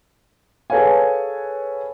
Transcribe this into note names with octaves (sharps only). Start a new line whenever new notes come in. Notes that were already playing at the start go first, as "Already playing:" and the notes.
G#4 A4 B4 C#5 F5 G#5